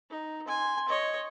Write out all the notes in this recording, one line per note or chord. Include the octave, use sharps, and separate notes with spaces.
D#4
G#5 C6
C#5 D#5